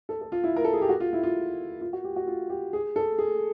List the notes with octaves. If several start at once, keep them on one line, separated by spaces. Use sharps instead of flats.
A4
A4
F4
E4
A#4
A4
G#4
G4
F#4
F4
E4
F4
F4
F#4
G4
F#4
F4
G4
G#4
A4
G#4